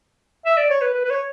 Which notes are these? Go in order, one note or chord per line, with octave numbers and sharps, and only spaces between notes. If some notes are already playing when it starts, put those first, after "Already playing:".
E5
D5
C#5
B4
B4
B4
C#5